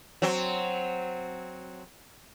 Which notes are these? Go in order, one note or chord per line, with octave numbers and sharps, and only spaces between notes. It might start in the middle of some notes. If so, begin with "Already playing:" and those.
F#3 C4